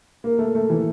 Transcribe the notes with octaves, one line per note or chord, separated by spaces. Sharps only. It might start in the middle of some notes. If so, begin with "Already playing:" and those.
A#3
A3
A3
E3